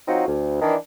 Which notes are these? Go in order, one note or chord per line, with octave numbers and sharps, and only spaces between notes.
F#3 C4 D#4 F4 F#4
D2
D#3 E3 D4